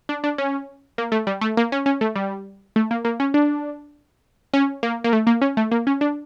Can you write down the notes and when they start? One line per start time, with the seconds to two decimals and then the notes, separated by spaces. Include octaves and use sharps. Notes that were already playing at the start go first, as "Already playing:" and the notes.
0.09 D4
0.24 D4
0.38 C#4
0.98 A#3
1.12 A3
1.27 G3
1.41 A3
1.57 A#3
1.72 C#4
1.86 C#4
2.01 A3
2.15 G3
2.76 A3
2.91 A#3
3.05 A#3
3.20 C#4
3.34 D4
4.53 C#4
4.83 A#3
5.04 A#3
5.13 A3
5.27 A#3
5.42 C#4
5.57 A3
5.71 A#3
5.87 C#4
6.01 D4